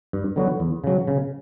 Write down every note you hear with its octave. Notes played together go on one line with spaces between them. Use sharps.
G2
D3 F#3 B3 F#4
E2
C#3 F#3
C#3